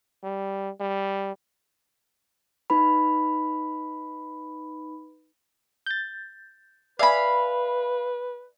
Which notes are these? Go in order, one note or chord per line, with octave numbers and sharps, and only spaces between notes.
G3
G3
D#4 B4 B5
G6 A6
B4 D5 E5 F5 G#5 B5